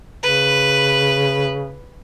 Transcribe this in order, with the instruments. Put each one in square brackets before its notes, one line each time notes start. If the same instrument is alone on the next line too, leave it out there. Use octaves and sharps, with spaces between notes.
[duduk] C#3 [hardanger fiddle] B4